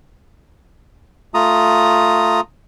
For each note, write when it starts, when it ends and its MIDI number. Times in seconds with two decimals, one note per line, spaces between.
1.34 2.41 57
1.34 2.41 65
1.34 2.41 82
1.34 2.41 87